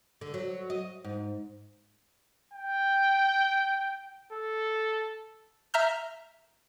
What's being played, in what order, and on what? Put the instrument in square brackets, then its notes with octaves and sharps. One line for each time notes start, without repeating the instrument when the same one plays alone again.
[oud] D3
F#3
D#5
G#2
[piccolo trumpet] G5
A4
[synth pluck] E5 A#5 F6 G6